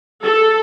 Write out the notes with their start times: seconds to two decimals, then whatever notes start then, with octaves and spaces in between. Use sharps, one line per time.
0.23 A4